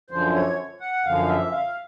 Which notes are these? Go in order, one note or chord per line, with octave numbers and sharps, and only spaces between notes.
F#2 D3 F3 C5
C#5
F#5
F#2 D3 F3 F5
E5
F5